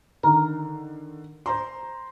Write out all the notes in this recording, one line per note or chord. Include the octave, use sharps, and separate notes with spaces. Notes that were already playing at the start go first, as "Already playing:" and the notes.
D3 D#3 A#4
C5 A#5 C6